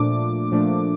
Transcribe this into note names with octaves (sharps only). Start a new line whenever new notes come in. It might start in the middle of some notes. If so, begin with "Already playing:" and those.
Already playing: A#2 F3 A3 D4 D6
A#2 F3 A3 D4